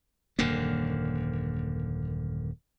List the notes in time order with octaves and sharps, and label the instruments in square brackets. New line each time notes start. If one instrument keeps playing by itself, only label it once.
[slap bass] D#1 F#2 D3 A#3